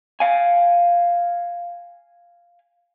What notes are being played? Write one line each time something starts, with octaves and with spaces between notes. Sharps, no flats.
F5 G#5